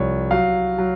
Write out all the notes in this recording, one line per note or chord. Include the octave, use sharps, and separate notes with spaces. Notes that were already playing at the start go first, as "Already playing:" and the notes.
Already playing: C2 F3 C#5
F#3 F5
F#3